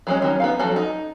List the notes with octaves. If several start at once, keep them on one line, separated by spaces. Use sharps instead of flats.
F#3 G#3 C#4
D#3 F#3 C#4
B3 D#4 F5
F3 F#3 F#4 A4
D#4